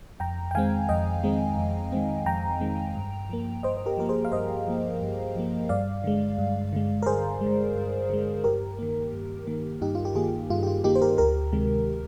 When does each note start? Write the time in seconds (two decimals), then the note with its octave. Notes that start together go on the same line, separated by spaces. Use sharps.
0.20 F2 G5 A#5
0.51 G5
0.55 D#3 G#3 C4 F5 G#5
0.89 F2 D#5 G5
1.23 D#3 G#3 C4
1.57 F2
1.92 D#3 G#3 C4
2.26 F2 G5 A#5
2.61 D#3 G#3 C4
2.95 G2
3.29 F3 A#3
3.63 G2 C5 D#5
3.77 C5
3.86 G4 A#4
3.98 F3 A#3 A#4
4.09 G#4 C5
4.25 F5
4.32 G2 C5 D#5
4.67 F3 A#3
5.01 G2
5.36 F3 A#3
5.69 G2 D5 F5
6.04 D3 G#3
6.38 G2
6.73 D3 G#3
7.02 A#4
7.06 G2 G#4 C5
7.41 D3 G#3
7.75 G2
8.10 D3 G#3
8.44 G2 G4 A#4
8.79 D#3 A#3
9.13 G2
9.47 D#3 A#3
9.82 G2 D#4 G4
9.95 F4
10.05 G4
10.15 D#3 A#3 F4 G#4
10.50 G2 F4
10.63 G4
10.67 F4
10.84 D#3 A#3 D#4 G4
10.95 C5
11.02 G4 A#4
11.18 D2 G4 A#4
11.52 C3 D#3 G#3